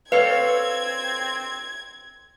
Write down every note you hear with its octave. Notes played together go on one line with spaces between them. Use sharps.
C4 A4 B4 C#5 F5 G#6